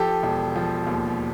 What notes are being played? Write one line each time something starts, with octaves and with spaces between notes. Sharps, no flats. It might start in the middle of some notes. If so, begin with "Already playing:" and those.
Already playing: F3 G4 A4
E1
F3
D#2